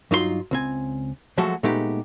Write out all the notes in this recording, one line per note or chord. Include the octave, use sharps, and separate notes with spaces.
G2 F#3 D#4 F4 A#4 C6
C#2 C4 G#5
F3 F#3 G#3 A3 F#4 A4
A#2 G#3 A3 B3 D#4 G4